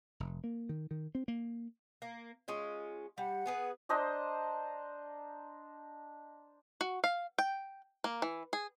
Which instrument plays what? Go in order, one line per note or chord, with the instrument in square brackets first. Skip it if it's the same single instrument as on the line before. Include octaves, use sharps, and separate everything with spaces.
[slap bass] F1
A#3
D#3
D#3
C4
A#3
[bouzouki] A#3
G#3 C#4 F4
[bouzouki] G3 [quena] F#5
[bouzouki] B3 G#4 B4
[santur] D4 C5 D#5 A#5
[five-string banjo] F#4
F5
G5
A#3
E3
G#4